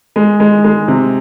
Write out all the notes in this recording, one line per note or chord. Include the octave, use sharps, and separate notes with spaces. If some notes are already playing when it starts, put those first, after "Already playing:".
G#3
G#3
G#3
C3